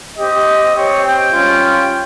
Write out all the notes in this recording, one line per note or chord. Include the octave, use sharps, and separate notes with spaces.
C4 G4 D#5
C4 G4 C#5
G5
G3 C#4 F4